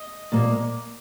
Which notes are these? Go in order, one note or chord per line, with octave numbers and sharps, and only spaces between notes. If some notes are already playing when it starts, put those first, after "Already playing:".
Already playing: D#5
A#2 A#3